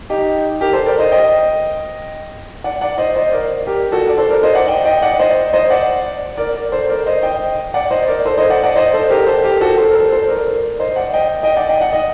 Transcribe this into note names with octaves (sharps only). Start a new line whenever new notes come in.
D#4 G4
G4 A#4
A4 C5
A#4 D5
C5 D#5
D#5 G5
D5 F#5
D5 F#5
C5 D#5
C5 D#5
A#4 D5
G4 A#4
F#4 A4
D5
A4 C5
A#4 D5
C5 D#5
D5 F#5
D#5 G5
D#5 G5
D5 F#5
C5 D#5
C5 D#5
D5 F#5
A#4 D5
A#4 D5
A4 C5
A#4 D5
C5 D#5
D#5 G5
D5 F#5
C5 D#5
A#4 D5
A4 C5
C5 D#5
D5 F#5
D5 F#5
C5 D#5
A4 C5
G4 A#4
A4 C5
G4 A#4
F#4 A4
A4 C5
A#4
A4 C5
A4 C5
A#4 D5
C5 D#5
D5 F#5
D#5 G5
D#5 G5
D5 F#5
D#5 G5
F#5
D#5